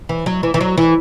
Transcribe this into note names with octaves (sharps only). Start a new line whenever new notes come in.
E3
F#3
E3
E3
F#3
E3